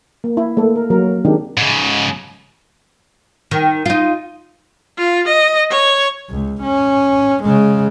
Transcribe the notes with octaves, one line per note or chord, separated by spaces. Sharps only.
A#3
E4
A3 A#3 A4
A#4
F3 F#3 A#3 A#4
D#3 G#3 C4 D4 D#4 G4
G#2 C#3
D#3
D#4 F4
F4
D#5
C#5
C#2
C#4
C#3 G#3